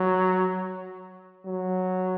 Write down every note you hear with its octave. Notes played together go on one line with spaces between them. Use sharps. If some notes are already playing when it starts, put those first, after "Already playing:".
Already playing: F#3
F#3